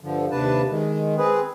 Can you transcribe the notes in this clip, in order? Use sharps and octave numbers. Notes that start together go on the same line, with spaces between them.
G2 D3 F3
D#2 C3 D4 B4 A5
D#3 G#3
C4 G#4 B4